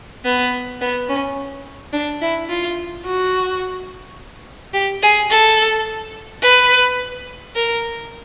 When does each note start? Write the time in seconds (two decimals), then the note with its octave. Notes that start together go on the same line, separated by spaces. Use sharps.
0.25 B3
0.81 B3
1.09 C#4
1.93 D4
2.21 E4
2.49 F4
3.06 F#4
4.74 G4
5.03 G#4
5.31 A4
6.42 B4
7.55 A#4